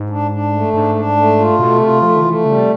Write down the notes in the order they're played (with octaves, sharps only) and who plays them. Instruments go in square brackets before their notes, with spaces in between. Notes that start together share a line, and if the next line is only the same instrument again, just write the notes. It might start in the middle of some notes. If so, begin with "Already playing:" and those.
Already playing: [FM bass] G#2
[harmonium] D4
D4
A3
[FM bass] G#2 [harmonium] D4
[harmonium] D4
A3
F4
[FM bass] B2 [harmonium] A3
[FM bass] C3 [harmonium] F4
[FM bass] F3 [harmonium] A3
[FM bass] D#3
[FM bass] E3 [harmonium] A3
[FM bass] C#3 [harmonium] G3
[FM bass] C3